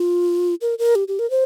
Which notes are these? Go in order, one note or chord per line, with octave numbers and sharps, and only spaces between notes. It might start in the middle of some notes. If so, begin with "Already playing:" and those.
Already playing: F4
A#4
A#4
G4
G4
A#4
C5